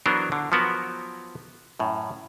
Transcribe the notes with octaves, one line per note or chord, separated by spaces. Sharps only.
E3 F#3 B3 D4 A#4 C5
D3
F3 F#3 B3 F#4 A#4
F#2 A2